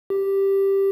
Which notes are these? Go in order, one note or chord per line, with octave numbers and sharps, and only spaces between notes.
G4